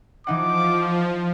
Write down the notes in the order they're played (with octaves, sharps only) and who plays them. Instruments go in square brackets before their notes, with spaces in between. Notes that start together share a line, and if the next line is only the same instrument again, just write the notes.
[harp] E3 D#4 F#5 [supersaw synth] F3 [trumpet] D6